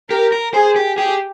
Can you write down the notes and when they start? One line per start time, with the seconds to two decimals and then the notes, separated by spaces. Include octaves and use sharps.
0.10 G4 A#4
0.32 A#4
0.54 G#4 C5
0.76 G4
0.97 G4 G#4